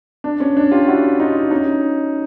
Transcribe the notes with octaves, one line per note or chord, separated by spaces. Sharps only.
D4
C#4
D4
F4 G4
E4 F#4
D#4 F4
C#4 D#4